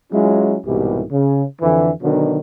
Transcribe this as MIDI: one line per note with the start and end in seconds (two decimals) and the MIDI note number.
0.12 0.57 54
0.12 0.57 56
0.12 0.57 61
0.12 0.57 64
0.12 0.57 65
0.66 1.03 36
0.66 1.03 44
0.66 1.03 47
0.66 1.03 52
0.66 1.03 67
1.11 1.44 49
1.62 1.90 41
1.62 1.90 50
1.62 1.90 52
2.03 2.39 47
2.03 2.39 50
2.03 2.39 51
2.03 2.39 54
2.03 2.39 62